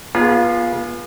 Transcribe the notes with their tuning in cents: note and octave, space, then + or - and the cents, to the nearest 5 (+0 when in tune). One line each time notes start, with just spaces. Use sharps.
B3 -30 F4 +0 G#4 +0